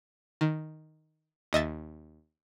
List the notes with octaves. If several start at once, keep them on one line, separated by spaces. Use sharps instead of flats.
D#3
D#2 D#5 E5 A6